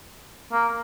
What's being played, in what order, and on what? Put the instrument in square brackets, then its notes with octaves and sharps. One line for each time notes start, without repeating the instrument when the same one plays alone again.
[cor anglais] A#3